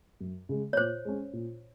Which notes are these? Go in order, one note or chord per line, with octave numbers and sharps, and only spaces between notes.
F#2
C#3 G#3
C#5
A#2 C5
G#3 C#4
A#2